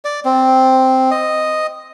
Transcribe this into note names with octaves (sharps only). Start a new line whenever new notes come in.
D5
C4
D#5